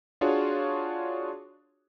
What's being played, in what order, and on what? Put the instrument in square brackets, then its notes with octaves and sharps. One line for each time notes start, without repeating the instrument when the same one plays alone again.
[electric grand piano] D4 F4 F#4 G#4 C#5